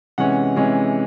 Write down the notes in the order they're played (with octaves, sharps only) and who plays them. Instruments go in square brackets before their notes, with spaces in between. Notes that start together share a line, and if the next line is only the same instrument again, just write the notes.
[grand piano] C3 E3 G#3 C#4 F#5
C3 E3 G#3 C#4